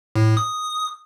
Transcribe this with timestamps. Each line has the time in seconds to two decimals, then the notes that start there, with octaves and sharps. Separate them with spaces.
0.15 A2
0.37 D#6